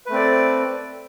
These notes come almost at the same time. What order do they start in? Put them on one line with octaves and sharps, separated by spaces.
B4 A3 C4 D5 A4